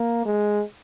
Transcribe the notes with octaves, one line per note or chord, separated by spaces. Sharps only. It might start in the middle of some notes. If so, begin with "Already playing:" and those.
Already playing: A#3
G#3